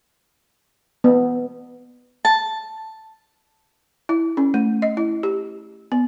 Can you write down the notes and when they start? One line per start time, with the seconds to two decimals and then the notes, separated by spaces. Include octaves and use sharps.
1.04 B3
2.25 A5
4.09 E4
4.37 C#4
4.54 A3
4.82 D#5
4.97 E4
5.23 G4
5.92 B3